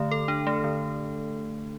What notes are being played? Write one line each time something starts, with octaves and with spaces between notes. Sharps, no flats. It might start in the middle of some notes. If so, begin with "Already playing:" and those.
Already playing: D3 A3
A4
D4
A3
D3